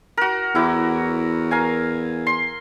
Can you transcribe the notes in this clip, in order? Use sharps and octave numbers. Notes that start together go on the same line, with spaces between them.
F#4 A#4
E2 E4 F#4 D6
A#4 F5 G#5
C6